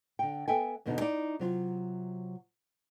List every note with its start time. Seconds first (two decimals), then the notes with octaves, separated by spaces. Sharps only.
0.19 D3 G5
0.48 B3 A4 E5 G5 G#5
0.86 E2 B2 D3 B3 D#4
1.01 D#4 E4 D5
1.39 C3 F#3 F4